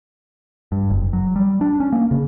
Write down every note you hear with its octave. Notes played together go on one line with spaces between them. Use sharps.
G2
F#1
F#3
G3
D4
C#4
A#3
C#3